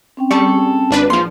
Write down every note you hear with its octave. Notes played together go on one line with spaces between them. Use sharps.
C4 C#4 G5
G3 G#4 A4 C#6
G#1 D4 B4
A#1 F3 F5 C6